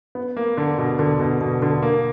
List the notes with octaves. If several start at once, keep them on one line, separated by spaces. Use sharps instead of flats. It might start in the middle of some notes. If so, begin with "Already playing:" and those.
B3
A#3
D3
B2
D3
B2
B2
D3
A#3